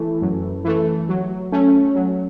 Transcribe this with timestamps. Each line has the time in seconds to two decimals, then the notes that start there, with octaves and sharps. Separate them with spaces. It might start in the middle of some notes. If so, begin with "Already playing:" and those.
Already playing: E3 A3
0.21 F#2
0.64 E3 A3
1.09 F#3
1.52 A3 C#4
1.95 F#3